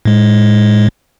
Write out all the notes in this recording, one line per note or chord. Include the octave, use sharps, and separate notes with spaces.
A2 G#3